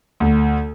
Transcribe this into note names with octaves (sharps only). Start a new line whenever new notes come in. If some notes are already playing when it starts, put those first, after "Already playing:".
D2